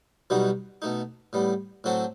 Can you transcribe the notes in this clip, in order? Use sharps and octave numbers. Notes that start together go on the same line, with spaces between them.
B1 B2 G3 D#4 F#4
B2 A3 D#4
A2 G3 B3
A2 F#3 C4 F#4 A4